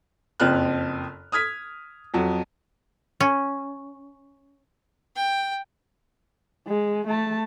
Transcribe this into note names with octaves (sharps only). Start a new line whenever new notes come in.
F#1 F2 C4 F6 F#6
D#6 F6 G#6 B6
F2 F#3
C#4
G5
G#3
A3 A5